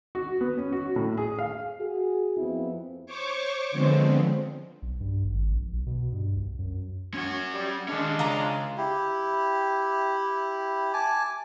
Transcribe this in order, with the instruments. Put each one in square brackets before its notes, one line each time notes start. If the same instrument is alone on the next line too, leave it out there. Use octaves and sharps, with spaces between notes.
[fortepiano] F#4
B3
C#4
F#4
A2
G#4
F5
[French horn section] F#4 G#4
F2 B3 C4 E4
[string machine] C5 C#5 C#6 D6
D3 F3 G#3 B3 C4
[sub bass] B1
G2
G#1
A#1
B1
B2
G2
C2
F#2
[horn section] F#3 C#5 [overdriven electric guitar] C#4 F#5
[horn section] G3
[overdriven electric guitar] D#3 C#4 [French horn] G#3 [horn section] D4
[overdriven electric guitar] C#2 [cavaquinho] F4 A#5 D6
[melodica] E4 G4
G#5 A5 D6